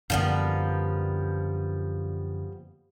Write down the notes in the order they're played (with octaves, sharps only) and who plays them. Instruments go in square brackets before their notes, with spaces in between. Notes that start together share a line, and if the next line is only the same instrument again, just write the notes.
[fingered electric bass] F#2 D3 A#3 [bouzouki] F3 G3 B3